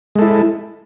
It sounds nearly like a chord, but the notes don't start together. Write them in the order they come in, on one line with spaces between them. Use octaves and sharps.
G#3 A4 E4